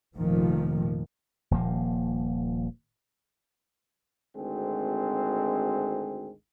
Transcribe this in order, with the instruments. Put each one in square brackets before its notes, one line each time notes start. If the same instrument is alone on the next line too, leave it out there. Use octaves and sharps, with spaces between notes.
[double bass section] F1 A#2 D#3 F3
[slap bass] D#1 A#2 F3 A#3
[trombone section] G#1 D2 G#3 C4